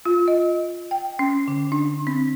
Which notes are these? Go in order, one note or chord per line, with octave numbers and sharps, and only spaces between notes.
F4
D#5
G5
C#4
D3
D4
C4